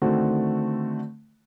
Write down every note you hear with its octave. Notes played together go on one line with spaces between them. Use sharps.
D3 D#3 A3 C4 F#4